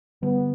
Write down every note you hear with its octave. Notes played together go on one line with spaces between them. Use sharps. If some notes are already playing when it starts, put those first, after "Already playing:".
D3 G3 B3